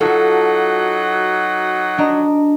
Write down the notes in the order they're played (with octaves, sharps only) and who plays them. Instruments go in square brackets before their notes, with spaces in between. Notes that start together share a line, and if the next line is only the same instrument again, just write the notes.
[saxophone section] F#3 D#4 F#5 [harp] F4 F#4 [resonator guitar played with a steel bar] A4
[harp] D4 D#5 A#5